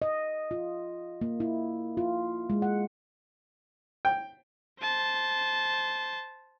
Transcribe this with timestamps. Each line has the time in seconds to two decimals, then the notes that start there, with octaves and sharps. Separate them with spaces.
0.02 D#5
0.51 F4
1.21 A#3
1.40 E4
1.97 F4
2.50 G#3
2.62 F#5
4.05 G5
4.81 C5 A5